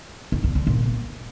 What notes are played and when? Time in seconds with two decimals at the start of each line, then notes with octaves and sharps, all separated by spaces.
0.32 E2
0.44 G2
0.55 D3
0.67 A#2